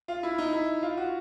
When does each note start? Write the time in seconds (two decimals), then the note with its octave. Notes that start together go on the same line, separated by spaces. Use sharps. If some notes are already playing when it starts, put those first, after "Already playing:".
0.08 F4
0.23 E4
0.38 D#4
0.53 E4
0.83 F4
0.97 F#4